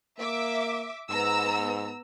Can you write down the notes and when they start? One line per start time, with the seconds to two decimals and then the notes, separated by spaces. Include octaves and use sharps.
0.19 A#3 E5 D6
1.10 G#2 B3 A#5 E6